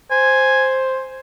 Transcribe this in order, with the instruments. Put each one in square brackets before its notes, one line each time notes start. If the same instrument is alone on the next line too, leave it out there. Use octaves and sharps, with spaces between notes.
[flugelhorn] C5 [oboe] G#5